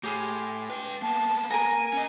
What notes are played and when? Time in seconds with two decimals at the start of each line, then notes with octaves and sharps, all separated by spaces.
0.03 A2 G4 G#4 C6
0.70 B4 G5
1.02 A#3 B3 A5
1.50 A#4 G#5 A#5
1.93 C#4 D#5